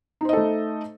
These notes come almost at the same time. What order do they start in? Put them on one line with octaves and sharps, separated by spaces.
D#4 C5 D#5 A4 A3